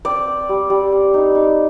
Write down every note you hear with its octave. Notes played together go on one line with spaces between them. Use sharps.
C4 D5
C4
G3
G3
C4
D#4
D#4